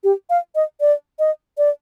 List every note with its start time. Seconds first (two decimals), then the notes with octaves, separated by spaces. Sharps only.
0.04 G4
0.30 F5
0.55 D#5
0.81 D5
1.19 D#5
1.58 D5